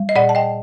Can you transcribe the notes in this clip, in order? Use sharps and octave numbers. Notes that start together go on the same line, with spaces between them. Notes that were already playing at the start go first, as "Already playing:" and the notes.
Already playing: G3
D#5
A#2 D5 F#5
A5
D#5 G5